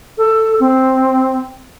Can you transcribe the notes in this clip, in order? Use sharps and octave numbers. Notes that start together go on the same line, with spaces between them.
A4
C4